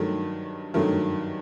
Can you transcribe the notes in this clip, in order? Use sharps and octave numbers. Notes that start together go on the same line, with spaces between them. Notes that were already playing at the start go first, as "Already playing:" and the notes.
Already playing: G2 D#3 F#3 A3
G2 D#3 F#3 A3